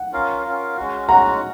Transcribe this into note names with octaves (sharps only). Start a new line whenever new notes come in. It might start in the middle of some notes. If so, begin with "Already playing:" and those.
Already playing: F#5
C#4 F4 A#4 F5
C#4 F4 A#4 F5
G#3 C#4 F#4
G#3 C#4 F#4 F#5 A#5